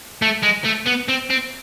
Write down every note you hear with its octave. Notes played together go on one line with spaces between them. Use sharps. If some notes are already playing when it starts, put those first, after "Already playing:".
A3
G#3
A3
B3
C4
C4